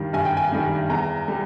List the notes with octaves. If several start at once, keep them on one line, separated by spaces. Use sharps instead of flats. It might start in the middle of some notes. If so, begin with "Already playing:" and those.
Already playing: G2 D#3 G3
G2 G#5
G5
G#5
D#3 G3
E2 A#5
G3